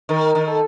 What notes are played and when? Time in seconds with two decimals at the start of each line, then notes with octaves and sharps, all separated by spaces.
0.09 D#3 A#4
0.35 D#3
0.47 A4